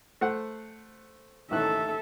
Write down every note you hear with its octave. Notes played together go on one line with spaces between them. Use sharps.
A3 C5 F#5
A1 D#3 A4 E5 F#6